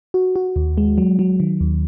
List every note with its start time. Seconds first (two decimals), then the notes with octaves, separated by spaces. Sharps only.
0.14 F#4
0.36 F#4
0.56 D#2
0.78 G#3
0.98 F#3
1.19 F#3
1.40 D#3
1.61 D#2